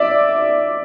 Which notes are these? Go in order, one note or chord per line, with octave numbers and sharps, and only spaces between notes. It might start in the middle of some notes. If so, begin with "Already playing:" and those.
Already playing: D5 E5